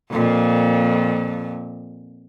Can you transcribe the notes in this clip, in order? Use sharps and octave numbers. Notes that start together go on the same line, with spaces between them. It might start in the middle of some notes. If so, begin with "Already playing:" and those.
F2 A#2